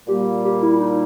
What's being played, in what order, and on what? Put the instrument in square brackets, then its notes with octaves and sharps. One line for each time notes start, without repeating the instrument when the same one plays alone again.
[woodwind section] A#2 G3 A#3 [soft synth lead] G4
[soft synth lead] G4
E4
D#4